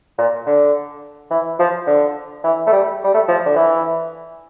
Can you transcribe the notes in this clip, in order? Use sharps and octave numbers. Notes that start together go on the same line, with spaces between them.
A#2
D3
E3
F3
D3
E3
A3
G3
G3
A3
F3
D3
E3